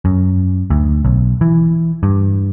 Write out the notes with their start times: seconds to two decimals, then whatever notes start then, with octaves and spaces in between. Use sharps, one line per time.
0.05 F#2
0.70 D2
1.05 B1
1.41 E3
2.03 G2